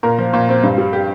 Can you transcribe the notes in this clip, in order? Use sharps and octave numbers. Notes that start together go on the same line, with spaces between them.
A#2 A#4
F3
A#2
C4
G2
G3
G4